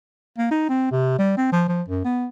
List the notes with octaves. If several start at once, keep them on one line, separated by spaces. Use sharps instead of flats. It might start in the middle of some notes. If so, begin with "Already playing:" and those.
A#3
D#4
C4
C3
G3
C4
F3
F3
F#2
B3